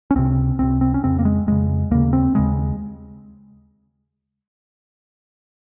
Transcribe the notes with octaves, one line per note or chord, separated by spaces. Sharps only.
C#4
C#2 C3 C4
C#2 C3 C4
C4
C#4
F2 C#3 C4
A#3
G#3
F2 C#3 G#3
D#2 C#3 A#3
C4
D#2 C#3 G#3